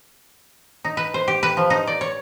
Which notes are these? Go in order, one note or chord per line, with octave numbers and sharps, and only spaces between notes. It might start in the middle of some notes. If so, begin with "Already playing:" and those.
D#4
B4
C5
G4
B4
F3
D#4
D5
C#5